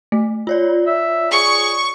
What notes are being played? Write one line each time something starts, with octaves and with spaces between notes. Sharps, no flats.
A3
F4 C#5 D5
E5
G#4 C#6